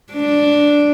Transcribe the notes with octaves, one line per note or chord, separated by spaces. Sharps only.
D4